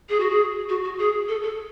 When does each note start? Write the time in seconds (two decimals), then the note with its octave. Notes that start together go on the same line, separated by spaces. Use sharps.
0.09 G#4
0.20 F#4
0.30 G#4
0.69 F#4
0.84 F#4
0.99 G#4
1.28 A4
1.43 A4